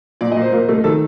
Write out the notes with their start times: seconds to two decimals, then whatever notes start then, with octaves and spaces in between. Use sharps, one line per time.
0.21 A#2 D5
0.32 D#5
0.37 A#2
0.42 C5
0.52 A#2 A#4
0.69 A3
0.84 D#3 A4